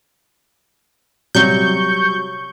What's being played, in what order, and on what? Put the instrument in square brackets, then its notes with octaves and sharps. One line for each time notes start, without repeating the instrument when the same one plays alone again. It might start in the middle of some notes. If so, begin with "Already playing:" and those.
[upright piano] C3 F#3 G3 [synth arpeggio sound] C#6 G6